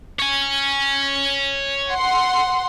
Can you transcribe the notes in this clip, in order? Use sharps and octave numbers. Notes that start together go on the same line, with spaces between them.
C#5 G#5
F#5 C6